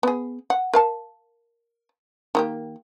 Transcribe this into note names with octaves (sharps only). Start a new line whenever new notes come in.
B3 G#4
F#5
A#4 F5 A5
D#3 A#3 G4